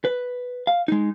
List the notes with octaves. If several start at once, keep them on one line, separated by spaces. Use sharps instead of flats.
B4
F5
G#3 D#4